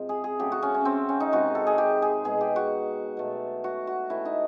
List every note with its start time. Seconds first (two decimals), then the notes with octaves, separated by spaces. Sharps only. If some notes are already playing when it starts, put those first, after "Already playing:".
Already playing: C3 F3 G#3
0.09 G#4
0.24 G#4
0.39 C#3 F#3 A3 G4
0.52 F#4
0.62 C#4
0.74 C#4
0.85 C4
1.09 C#4
1.20 D#4
1.32 C3 D#3 G#3 F#4
1.55 A4
1.67 G#4
1.78 G4
2.02 G#4
2.24 B2 G#3 G#4
2.41 G4
2.56 F#4
3.17 B2 F#3 A3
3.64 F#4
3.87 F#4
4.10 A2 E3 A3 E4
4.25 D#4